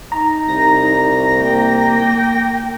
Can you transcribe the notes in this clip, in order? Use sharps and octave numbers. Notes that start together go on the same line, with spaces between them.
D#4 A#5
C2 A#6
A#3 G5